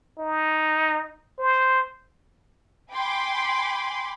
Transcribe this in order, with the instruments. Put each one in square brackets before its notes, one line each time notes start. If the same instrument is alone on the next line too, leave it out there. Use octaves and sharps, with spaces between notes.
[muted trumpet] D#4
C5
[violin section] G5 G#5 B5 C6 D6